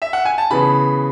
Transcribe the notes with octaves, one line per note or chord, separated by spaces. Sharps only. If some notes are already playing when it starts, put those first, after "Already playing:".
E5
F#5
G#5
A5
C#3 E3 B3 B5